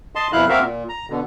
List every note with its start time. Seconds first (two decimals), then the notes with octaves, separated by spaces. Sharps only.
0.15 D#5 A5 C6
0.33 F2 B2 E4 F5 F#6
0.49 A#3 C4 F#4 A#4 E5 F5
0.64 A#2
0.89 A#5
1.10 B2 D3